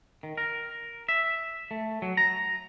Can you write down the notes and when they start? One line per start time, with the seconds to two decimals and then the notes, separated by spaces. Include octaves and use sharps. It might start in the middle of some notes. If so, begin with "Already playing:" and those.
0.23 D#3
0.37 A#4
1.09 E5
1.71 A3
2.02 F#3
2.17 A#5